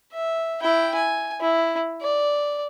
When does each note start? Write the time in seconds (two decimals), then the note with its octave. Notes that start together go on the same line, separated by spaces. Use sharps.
0.12 E5
0.62 E4 G5
0.95 G#5
1.41 E4
2.01 D5